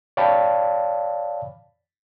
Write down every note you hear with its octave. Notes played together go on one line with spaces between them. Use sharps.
C#5 D5 F5 G5 A5 B5